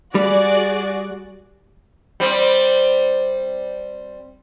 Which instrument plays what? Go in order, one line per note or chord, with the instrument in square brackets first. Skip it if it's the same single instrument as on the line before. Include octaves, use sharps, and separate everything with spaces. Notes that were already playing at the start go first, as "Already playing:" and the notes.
[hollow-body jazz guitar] G3 [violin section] F#4 G#4 D5
[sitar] G3 C4